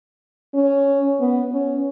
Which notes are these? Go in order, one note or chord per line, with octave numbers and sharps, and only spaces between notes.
C#4
B3
C#4